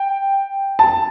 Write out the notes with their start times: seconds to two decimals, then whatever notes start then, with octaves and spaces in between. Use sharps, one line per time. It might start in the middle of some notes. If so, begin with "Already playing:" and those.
Already playing: G5
0.79 A5